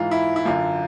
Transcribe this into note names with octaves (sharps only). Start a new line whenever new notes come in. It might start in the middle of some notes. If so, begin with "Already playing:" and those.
Already playing: G#2 E3 F4
E4
E4
F#2 D3 F4